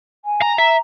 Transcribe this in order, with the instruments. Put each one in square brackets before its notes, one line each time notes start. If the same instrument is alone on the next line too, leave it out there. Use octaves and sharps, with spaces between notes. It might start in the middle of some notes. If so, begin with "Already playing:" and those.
[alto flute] G#5
[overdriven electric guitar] A#5
[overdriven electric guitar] E5 [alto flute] A#5